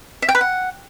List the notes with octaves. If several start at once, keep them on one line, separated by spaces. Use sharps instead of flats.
E5
G5
B4
F#5